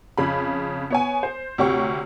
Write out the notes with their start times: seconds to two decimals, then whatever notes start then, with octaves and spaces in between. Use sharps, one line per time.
0.18 F2 C#3 B5
0.90 B3 C#5 G#5
1.23 C5
1.58 D2 C3 C#5 G5 C#6